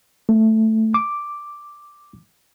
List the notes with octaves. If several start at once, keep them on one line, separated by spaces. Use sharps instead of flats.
A3
D6